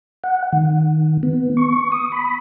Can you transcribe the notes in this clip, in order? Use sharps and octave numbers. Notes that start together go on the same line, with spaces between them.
F#5
D#3
B3
C#6
D#6
B5